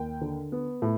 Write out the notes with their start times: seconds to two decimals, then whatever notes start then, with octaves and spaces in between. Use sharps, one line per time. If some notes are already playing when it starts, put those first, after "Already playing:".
Already playing: D#2 G5
0.21 D3
0.52 B3
0.82 A2